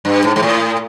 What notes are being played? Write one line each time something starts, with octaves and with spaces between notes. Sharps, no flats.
G2
G#2
G#2
A2